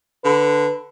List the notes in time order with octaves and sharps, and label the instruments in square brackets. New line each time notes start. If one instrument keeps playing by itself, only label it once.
[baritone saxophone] D3 [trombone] B4